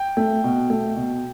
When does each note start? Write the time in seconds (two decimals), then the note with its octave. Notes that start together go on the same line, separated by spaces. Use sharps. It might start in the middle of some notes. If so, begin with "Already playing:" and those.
Already playing: G5
0.17 A3
0.44 B2
0.70 A3
0.96 B2